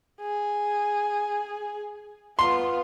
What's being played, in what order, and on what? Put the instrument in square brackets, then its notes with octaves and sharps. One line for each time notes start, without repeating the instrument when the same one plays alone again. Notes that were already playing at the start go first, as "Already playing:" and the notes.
[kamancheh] G#4
[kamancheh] B3 F4 [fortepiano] C6